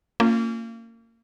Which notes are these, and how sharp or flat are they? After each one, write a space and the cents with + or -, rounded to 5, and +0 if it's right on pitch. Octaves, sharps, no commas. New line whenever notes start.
A#3 -30 C#4 +0 F4 +0